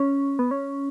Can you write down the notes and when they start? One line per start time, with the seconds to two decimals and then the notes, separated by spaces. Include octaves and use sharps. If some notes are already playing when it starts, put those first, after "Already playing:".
Already playing: C#4
0.39 B3
0.51 C#4